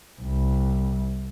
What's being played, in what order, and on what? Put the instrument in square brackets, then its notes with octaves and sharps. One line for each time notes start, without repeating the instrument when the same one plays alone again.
[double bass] C2